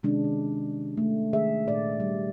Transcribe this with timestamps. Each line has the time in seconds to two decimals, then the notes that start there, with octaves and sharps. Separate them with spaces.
0.03 C3 D#3 G#3 C#4 D4
0.24 D#3
0.97 A3
1.33 D#3 G#3 G#4 E5
1.67 A#2 D5
2.00 G3